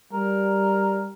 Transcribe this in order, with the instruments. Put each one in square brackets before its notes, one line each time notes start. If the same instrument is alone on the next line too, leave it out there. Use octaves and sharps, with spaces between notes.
[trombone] G3 [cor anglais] A#4